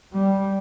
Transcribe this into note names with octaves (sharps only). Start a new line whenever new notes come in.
G3